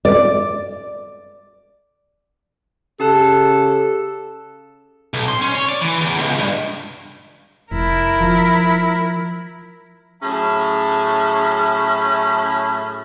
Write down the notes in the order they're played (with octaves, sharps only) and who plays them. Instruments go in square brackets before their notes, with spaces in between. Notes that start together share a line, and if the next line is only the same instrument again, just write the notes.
[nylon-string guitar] D5
[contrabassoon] C#3 [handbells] G4 A5 F#6 [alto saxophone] A4
[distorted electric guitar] B1
C6
C#4
C#5
D5
E3
E2
C#2
G2
[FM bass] F1 [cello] E4 A#4
[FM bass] F3
[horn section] A2 F#3 C#4 G#4 E5 A5